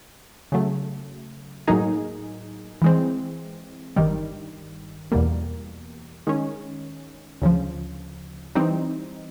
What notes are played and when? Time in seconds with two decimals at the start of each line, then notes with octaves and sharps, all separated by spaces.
0.52 C#3 F#3 A3
1.67 A2 F#3 A#3 D#4 G#4
2.82 E3 G#3 C4
3.96 G1 G2 D#3 G3
5.12 E2 B2 G3 A#3
6.27 D#3 G#3 C#4
7.42 D2 C#3 F3
8.55 E3 G3 C4 D#4